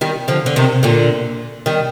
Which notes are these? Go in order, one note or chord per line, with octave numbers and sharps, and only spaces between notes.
D#3 G3
D3 F3
D3
C3 D#3
A#2 D3
D#3 G3